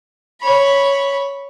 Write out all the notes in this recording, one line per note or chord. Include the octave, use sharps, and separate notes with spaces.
C#5 B5